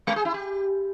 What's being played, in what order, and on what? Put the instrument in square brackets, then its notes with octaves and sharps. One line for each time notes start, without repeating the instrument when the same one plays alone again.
[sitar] G#3
G#4
E4
G4